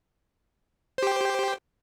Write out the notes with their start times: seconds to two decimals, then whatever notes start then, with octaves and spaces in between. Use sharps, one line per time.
0.98 C5
1.03 G4
1.07 G5